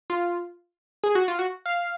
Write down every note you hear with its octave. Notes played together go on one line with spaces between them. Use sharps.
F4
G#4
F#4
F4
F#4
F5